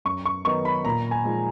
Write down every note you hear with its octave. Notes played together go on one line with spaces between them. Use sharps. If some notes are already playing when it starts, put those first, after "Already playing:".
F#2 C#6
C#6
D#3 F#3 B3 D#4 C#6
B5
A#2 A#5
G#5
F3 G#3 D#4